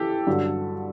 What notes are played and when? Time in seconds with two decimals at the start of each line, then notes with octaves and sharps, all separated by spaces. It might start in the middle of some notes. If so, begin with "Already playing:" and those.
Already playing: E3 G4 A4
0.27 G2 D3 F#3